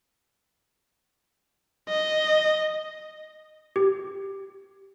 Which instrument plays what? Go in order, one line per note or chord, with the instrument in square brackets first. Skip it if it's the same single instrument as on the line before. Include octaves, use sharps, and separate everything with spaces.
[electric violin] D#5
[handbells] G4